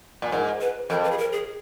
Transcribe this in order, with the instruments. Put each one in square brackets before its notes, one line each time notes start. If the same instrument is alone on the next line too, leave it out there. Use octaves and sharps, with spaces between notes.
[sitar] A#2
[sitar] G#2 [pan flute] A#4
[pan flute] B4
[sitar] F2 [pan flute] A#4
[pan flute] B4
G#4
A#4
G#4